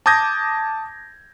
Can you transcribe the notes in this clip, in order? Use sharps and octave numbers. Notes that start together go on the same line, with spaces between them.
A5 D6 D#6 G6 G#6 A#6